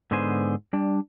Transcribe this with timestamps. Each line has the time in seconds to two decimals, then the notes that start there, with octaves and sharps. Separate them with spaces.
0.11 G#2 D3 B3 G#4 C5 G#5
0.73 G3 D4